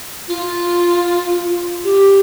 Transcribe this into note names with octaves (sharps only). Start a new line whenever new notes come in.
F4
G4